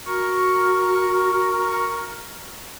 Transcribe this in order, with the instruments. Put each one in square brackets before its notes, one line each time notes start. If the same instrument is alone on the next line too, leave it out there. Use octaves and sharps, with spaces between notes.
[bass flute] F#4 [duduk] A#4 [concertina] C#6